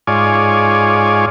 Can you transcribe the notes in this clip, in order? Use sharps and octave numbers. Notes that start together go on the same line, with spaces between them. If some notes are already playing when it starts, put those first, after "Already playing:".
G#2 F4 C#5 D5 G#5